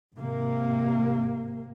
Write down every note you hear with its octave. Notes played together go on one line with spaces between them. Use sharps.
G#1 C3 A#3